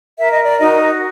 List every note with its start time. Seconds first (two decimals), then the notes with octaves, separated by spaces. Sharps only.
0.18 A#4 E5
0.32 D#5
0.45 D5
0.58 D#4 F#4 D#5